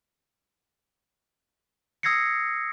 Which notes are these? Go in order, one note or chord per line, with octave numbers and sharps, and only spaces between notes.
D#6 E6 G#6 A#6 C7 C#7